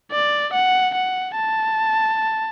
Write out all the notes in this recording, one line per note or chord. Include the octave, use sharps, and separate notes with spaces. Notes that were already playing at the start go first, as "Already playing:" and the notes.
D5
F#5
F#5
A5